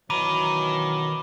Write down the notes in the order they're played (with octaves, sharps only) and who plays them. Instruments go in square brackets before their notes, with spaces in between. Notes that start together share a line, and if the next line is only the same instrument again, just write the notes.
[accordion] B2 E3 F#3 [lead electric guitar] D#3 A#5 [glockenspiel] B5 D6 D#7